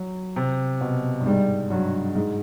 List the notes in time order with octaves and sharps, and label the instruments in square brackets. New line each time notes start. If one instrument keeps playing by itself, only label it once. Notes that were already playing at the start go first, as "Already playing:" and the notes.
Already playing: [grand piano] F#3
C3
B2
G2
[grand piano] G#2 [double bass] G3
[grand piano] G2 [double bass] F#3
[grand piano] G#2